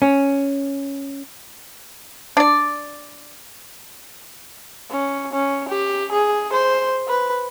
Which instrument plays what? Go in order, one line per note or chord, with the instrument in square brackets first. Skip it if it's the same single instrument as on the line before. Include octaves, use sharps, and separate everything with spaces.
[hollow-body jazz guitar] C#4
[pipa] D4 D5
[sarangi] C#4
C#4
G4
G#4
C5
B4